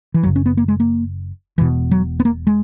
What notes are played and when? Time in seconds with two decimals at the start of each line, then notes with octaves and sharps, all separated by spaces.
0.14 E3
0.23 F#1 F#2 C#3 F#3
0.36 C#4
0.46 B3
0.57 A#3
0.68 G#3
0.80 A#3
1.58 E1 E2 B2 E3
1.91 F#3
2.20 B3
2.25 A#3
2.47 G#3